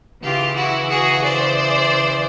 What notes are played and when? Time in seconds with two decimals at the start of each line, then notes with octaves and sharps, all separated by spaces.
0.23 C#3 E3 F4 G4
0.56 E4 F#4
0.89 F#4 G#4
1.22 C5 D5